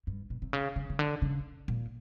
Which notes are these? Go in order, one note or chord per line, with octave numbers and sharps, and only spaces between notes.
G2
B2
C3
C#3
C#3
C#3
D3
C#3
A#2